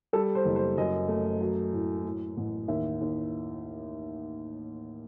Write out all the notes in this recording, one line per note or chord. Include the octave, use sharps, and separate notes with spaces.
G3 A4
C5
F#1
C5
F#2 D#5
A3
F#3
A2
A2
A1
D#2 E5
D#2